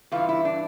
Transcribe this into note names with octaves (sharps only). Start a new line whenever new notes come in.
G2 E3 F4
E4
D4